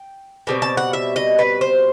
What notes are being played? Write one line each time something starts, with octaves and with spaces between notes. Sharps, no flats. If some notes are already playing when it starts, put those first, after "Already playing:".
Already playing: G5
B2 G3 C4
A5
F#5
E5
D#5
B4
C5